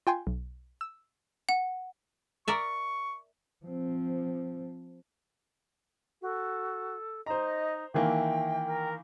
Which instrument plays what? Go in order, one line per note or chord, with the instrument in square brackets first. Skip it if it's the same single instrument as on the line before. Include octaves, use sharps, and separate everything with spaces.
[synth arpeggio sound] F4 G5 G#5 C6
B1
E6
[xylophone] F#5
[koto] A#4 D5 E5 [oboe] C#6
[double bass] F3 C4
[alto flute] F#4 [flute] A4
[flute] D#4 [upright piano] C5 A#5 [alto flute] D#5
[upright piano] D#3 E3 A#3 [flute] E5 [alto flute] G5
[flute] A#4